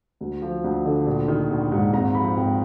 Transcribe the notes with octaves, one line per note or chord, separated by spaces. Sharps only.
D2
F3
D2
D3
A#1
D#3
A#1
G#2
G#1 A#5
F3 B5
G#1 G5